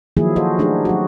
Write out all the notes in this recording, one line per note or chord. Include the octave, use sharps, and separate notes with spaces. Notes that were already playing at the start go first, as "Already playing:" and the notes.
D#3 F3 F#3 A#3 E4 G#4
F4 F#4 A4 C5 D#5
A3 D4 D#4 G4 G#4
F#3 F#4